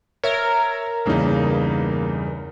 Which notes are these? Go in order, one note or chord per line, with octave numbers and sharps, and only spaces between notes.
A#4 C#5 E5 G#6
E2 G2 C#3 A#3 D#4